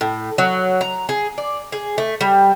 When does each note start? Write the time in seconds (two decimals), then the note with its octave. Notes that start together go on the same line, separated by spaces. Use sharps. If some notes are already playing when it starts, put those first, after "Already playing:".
0.01 A2
0.38 F#3
0.81 A#5
1.09 G#4
1.38 D5
1.72 G#4
1.98 A3
2.21 G3